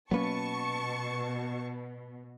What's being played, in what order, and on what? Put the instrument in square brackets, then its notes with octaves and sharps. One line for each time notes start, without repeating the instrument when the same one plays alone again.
[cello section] B2 [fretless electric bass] F#3 A#3 C#4 [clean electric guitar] B3 B4 [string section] A5 C#6